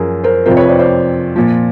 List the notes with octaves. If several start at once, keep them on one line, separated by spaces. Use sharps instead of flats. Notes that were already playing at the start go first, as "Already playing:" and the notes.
Already playing: F#2 F3 G#4 A#4
A#4 C5
F2 C3 F3 A#4 C5
B4 C#5
C5 D5
C5 D5
A#2 F3